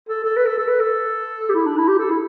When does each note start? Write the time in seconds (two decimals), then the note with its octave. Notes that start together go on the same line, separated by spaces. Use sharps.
0.09 A4
0.24 A4
0.36 B4
0.46 A4
0.58 A4
0.68 B4
0.80 A4
1.50 G4
1.55 E4
1.66 D4
1.78 E4
1.88 G4
1.99 A4
2.10 E4